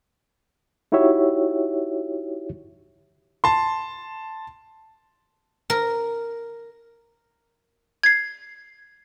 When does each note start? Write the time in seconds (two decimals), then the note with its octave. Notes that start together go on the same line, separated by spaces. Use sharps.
0.92 D#4 E4 F#4 G4 C#5 E5
3.44 A5 C6
5.70 A#4
8.03 G#6 C7